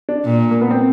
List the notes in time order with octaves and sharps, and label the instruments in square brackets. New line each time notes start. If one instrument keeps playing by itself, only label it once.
[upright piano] D4
[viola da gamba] A#2
[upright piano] A#3
B3
C4